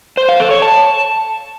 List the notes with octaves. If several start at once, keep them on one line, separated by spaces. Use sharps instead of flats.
C5
F5
A4
C#5
A5